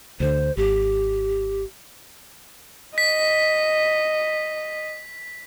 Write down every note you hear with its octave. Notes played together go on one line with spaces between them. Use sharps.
D2 D3 C5
G#1 G4
D#5 B6